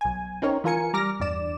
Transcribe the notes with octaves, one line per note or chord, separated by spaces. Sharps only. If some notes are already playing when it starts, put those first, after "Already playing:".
B1 G#5
C4 C#4 D#4 A#4 C#5
E3 F4 A#4 G#5 C#7
G3 A#5 D6 F6 A#6
E2 G2 D5 E7